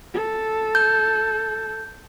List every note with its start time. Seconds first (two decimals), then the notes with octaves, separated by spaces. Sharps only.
0.13 A4
0.75 G6